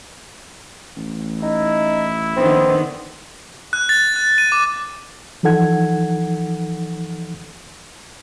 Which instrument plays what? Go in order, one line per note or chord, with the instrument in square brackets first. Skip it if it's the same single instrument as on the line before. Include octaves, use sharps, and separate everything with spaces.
[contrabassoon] A1
[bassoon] D#4 [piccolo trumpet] E4
[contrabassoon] A#1 [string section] D3 D#3 B3 [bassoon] C4
[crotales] F#6
A6
F#6
D#7
D6
[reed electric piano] E3 F3 D#4 A4 F#5 G#6